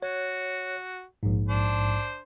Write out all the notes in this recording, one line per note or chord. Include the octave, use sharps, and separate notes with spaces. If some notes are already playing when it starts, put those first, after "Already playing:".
F#4 C#5
A#1 G#2
D4 C5